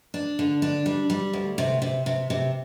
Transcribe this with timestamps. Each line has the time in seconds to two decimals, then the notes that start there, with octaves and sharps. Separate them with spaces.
0.14 D4
0.39 D3
0.62 D4
0.86 G3
1.10 G3
1.33 D2
1.58 C3
1.82 C3
2.06 C3
2.30 C3